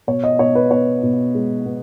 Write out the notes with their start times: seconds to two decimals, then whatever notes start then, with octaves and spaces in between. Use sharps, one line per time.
0.07 B2 C#5
0.24 D#5
0.39 B2 C#5
0.55 B4
0.71 B3 C#5
1.03 B2
1.35 G#3
1.66 B3